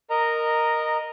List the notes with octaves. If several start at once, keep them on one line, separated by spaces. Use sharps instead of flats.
A#4 D#5 A#5